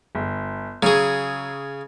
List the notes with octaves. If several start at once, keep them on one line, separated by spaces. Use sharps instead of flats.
G1
C#3 F#3 G#4